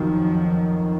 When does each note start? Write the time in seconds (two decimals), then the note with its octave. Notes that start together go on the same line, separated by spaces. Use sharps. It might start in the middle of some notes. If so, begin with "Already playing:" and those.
Already playing: F2 D#3 F3 F#3